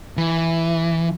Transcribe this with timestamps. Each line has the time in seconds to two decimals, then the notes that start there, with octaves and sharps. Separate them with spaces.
0.17 E3